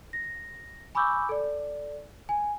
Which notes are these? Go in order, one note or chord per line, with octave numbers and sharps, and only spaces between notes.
A#6
G#5 B5 C#6 D6 E6 G6
A4 D5
G#5